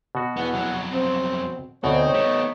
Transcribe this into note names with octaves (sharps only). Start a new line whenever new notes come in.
B2 F#4
E2 E3 B3 F#5
F2 F#3
C4
D2 B2 C4 D#4 C#5
A3 B3 G4